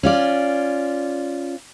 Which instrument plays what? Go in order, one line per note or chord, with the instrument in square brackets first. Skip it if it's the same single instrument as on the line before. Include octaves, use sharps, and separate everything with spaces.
[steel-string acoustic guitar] C#4 F4 D5